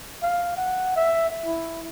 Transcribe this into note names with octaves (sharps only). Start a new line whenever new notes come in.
F5
F#5
E5
E4